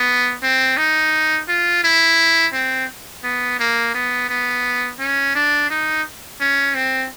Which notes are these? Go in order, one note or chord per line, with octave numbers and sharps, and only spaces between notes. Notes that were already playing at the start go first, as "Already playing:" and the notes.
Already playing: B3
C4
D#4
F4
E4
C4
B3
A#3
B3
B3
C#4
D4
D#4
C#4
C4